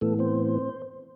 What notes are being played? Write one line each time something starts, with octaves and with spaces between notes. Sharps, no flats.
A2 E3 A3 B3 A4
C4 C5